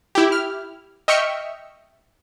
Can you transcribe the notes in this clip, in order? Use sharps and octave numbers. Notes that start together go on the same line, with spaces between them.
E4 G4
F6
D#5 E5 G5 C#6 F6 C#7